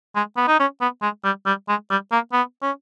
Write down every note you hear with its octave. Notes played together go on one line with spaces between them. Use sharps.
G#3
B3
D#4
C#4
B3
G#3
G3
G3
G#3
G3
A#3
B3
C#4